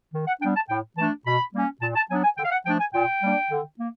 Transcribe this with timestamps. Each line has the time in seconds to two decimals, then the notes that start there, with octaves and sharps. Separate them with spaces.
0.13 D#3
0.27 F#5
0.41 G3 B3 D4 G5
0.55 A5
0.69 A2 G5
0.97 E3 A3 D4 A5
1.25 B2 B5
1.53 G3 A#3 C#4
1.81 A#2 A5
1.96 A5
2.10 F#3 B3 D4 G#5
2.24 G#5
2.37 D3 G5
2.44 F5
2.51 F#5
2.65 F3 A3 D4 G5
2.80 G#5
2.93 A#2 G5
3.22 G3 A#3 D4
3.50 D3
3.78 A#3